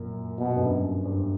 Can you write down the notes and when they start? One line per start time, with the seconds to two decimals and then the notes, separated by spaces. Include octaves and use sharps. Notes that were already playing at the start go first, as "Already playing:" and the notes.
Already playing: F#2 A#2
0.38 B2
0.56 G2
0.61 F#2
1.05 G2